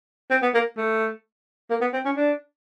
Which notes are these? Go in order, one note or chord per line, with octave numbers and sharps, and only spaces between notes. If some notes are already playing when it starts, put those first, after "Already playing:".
C4
B3
A#3
A3
A#3
B3
C4
C#4
D4